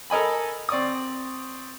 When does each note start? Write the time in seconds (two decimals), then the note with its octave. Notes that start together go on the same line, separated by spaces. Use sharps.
0.10 A4 A#4 D#5 G#5 B5
0.69 C4 D5 C#6 D#6